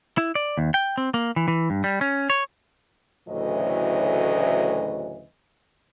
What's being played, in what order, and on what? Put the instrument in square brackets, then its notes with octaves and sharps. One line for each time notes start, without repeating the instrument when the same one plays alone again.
[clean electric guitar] E4
D5
D#2
G5
C4
A#3
E3
E3
G2
G3
C#4
C#5
[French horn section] D2 A2 C#3 E3 F#3 D#5